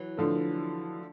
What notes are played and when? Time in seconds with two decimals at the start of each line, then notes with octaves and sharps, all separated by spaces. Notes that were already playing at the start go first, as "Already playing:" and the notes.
Already playing: E3 F#3
0.17 D3 F3 A3